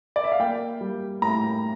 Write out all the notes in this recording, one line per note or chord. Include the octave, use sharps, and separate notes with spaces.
D5
E5
F5
A#3 G5
G3
A2 A#5